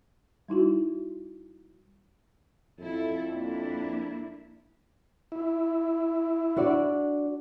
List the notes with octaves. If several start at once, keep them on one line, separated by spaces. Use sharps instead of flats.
G3 D#4 E4 F#4
F2 E4 A4
A#3 D4 E4
E4
D4 F#4 D5